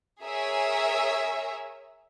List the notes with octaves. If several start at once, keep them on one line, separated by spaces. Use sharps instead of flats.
G#4 A#4 C#5 E5 G#5